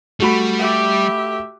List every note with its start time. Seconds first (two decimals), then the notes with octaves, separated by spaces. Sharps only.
0.20 G3 A3 F#4 B5
0.59 G4 E5